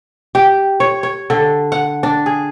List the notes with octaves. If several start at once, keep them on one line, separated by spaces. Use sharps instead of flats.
G4
C#5
C#5
D3
F#5
D4
G#4